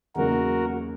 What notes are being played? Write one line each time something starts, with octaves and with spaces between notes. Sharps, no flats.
E2 C#3 F#3 A#3 D#4 F#4 A#4